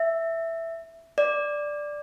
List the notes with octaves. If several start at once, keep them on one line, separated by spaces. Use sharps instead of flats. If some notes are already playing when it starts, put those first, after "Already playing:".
Already playing: E5
D5